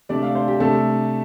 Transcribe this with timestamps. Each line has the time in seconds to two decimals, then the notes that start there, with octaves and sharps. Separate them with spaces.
0.09 C3 A3 D4 D5
0.23 F5
0.35 C5
0.48 G4
0.60 C3 A3 D4 A4